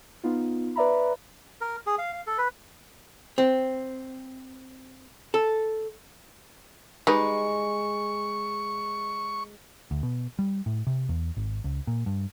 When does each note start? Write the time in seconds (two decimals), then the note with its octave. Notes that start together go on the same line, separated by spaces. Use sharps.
0.24 B3 D#4 F4
0.76 B4 D5 E5 A#5 B5
1.61 A#4
1.86 G#4
1.98 F5
2.13 F5
2.27 A4
2.38 B4
3.38 C4
5.34 A4
7.07 G3 G#3 D#4 B4 C#6
9.91 D2
10.03 B2
10.39 G3
10.66 A2
10.87 C3
11.09 E2
11.37 G#1
11.64 C#2
11.87 A#2
12.06 G2